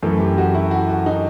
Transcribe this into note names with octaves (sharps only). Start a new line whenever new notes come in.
F#2 E3 A3 A4
G4
F#4
E4
F#4
F#4
D#4